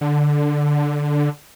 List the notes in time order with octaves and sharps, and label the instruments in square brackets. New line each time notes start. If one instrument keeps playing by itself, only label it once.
[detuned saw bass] D3